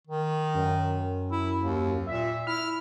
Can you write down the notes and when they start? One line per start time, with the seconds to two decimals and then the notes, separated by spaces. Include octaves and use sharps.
0.07 D#3
0.54 F#2
1.31 E4
1.61 D#2
2.07 A#2 E5
2.47 E4 F6